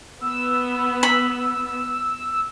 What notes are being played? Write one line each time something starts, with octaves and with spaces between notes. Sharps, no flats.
B3 E6
B5